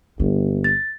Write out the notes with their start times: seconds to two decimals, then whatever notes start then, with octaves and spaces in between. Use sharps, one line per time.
0.19 G1 G3 A#3
0.64 A6